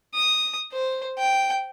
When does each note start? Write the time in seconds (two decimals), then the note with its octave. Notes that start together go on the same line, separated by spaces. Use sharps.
0.14 D#6
0.72 C5
1.18 G5